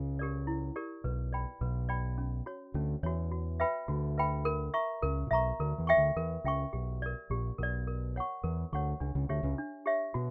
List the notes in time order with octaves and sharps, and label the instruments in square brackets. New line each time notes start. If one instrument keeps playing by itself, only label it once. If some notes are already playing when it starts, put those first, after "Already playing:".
Already playing: [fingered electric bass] C#2 C#3
[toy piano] G4 A#4 D5
E4
G4 A#4 D5
[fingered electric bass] B1 B2 [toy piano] B4
[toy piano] D5 G5 B5
[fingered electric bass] B1 B2 [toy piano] B4
[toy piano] D5 G5 B5
C#4
F#4 C#5
[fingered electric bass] D2 D3 [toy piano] C#4
[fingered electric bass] E2 E3 [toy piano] F#4 C#5
[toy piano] F#4
B4 E5 G5 B5
[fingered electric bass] D2 D3 [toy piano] F#4
[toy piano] B4 E5 G5 B5
A#4
E5 A#5 C#6
[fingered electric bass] C#2 C#3 [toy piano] A#4
[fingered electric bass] A#2
[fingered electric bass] B1 B2 [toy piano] E5 A#5 C#6
[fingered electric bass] D2 D3 [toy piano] A#4
[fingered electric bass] E2 E3
[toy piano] E5 G5 C#6
[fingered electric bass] D2 D3
[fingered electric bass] E2 E3 [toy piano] A#4
[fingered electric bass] C#2 C#3 [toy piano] E5 G5 C#6
[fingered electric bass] B1 B2 [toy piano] G4
[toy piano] A#4 D5
[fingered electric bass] A#1 A#2 [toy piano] G4
[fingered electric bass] B1 B2 [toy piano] A#4 D5
[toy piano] A#4
C#5 F#5 C#6
[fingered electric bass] E2 E3 [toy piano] A#4
[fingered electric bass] D2 D3 [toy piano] C#5 F#5 C#6
[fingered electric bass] C#2 C#3 [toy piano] D4
[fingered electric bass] C#2 C#3
[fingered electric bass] D2 D3 [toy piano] G4 C#5 E5
[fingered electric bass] C#2 C#3
[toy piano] D4
G4 C#5 E5
[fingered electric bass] B2 [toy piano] F#4